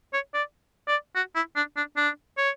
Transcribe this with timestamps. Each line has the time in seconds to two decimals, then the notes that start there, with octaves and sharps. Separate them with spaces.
0.13 C#5
0.34 D5
0.88 D5
1.16 F#4
1.35 E4
1.56 D4
1.76 D4
1.97 D4
2.38 C#5